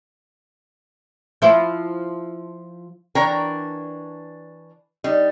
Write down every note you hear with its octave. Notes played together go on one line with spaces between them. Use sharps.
F3 E4 C5
E3 D4 A#4 C#5 G5 A#5
G3 D#4